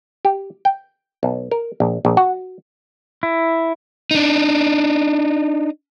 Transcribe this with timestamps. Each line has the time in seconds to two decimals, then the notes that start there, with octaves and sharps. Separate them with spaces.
0.25 G4
0.65 G5
1.23 B1
1.51 A#4
1.80 A#1
2.05 A#1
2.17 F#4
3.23 E4
4.11 D4 D#4